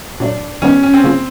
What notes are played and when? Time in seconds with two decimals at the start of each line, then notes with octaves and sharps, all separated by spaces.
0.20 A#2 F#3 A3 D4
0.62 D#3 G3 B3 C#4 D#4
0.83 C#4
0.94 C4
1.04 C#3 F#3 A#3 C#4 F4